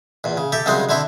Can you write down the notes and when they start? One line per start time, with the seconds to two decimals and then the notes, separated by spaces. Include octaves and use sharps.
0.24 E2 A#2
0.37 C#3
0.52 G4 A4 E5
0.66 C2 C#3 F#3 G#3 C5 D#5
0.89 D3 C4 E4 E5